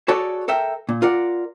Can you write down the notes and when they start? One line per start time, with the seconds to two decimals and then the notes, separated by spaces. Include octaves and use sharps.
0.08 F#4 G#4 A4 C#5 D5
0.48 A4 A#4 E5 G5
0.89 A#2
1.02 F4 A#4 D5 F#5